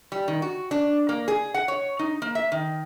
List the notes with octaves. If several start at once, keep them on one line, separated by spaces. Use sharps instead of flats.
G3
D#3
F#4
D4
A#3
G#4
F#5
C#5
D#4
A#3
E5
D#3